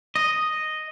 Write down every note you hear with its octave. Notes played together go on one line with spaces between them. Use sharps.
D#5